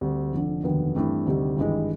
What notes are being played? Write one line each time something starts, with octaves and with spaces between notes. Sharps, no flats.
D2 D3 G3 C4
F1 F2 D3
F1 D#2 D3 F#3 B3
G2 E3 A3 C4
D2 C3 D#3 G3
G#1 G2 E3 G#3